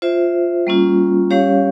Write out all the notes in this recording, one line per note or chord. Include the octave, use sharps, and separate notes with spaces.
F4 C5 E5
G3 A#3 C#4 F4
G3 C#4 G4 C#5 F5